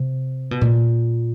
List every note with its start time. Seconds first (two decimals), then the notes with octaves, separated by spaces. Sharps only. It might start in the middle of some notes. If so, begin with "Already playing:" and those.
Already playing: C3
0.51 B2
0.61 A#2